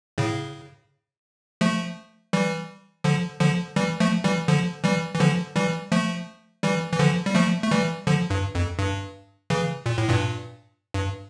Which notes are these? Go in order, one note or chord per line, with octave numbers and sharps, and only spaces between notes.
A2 C#3
F3 A3
E3 G3
D3 F3
D3 F3
E3 G3
F3 A3
E3 G3
D3 F3
E3 G3
E3
D3 F3
E3 G3
F3 A3
E3 G3
E3
D3 F3
G3
F3 A3
A3
E3 G3
D3 F3
G2
F2
G2
C#3 E3
A#2
A2
G2 A#2
G2